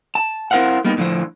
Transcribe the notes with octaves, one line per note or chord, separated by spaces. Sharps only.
A5
C4 E4 A#4 C5 F5 F#5
G3 A#3 B3 D#4
A2 D3 E3 F3 C5